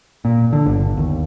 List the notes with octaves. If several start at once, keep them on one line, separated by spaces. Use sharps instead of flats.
A#2
D3
G1
D#2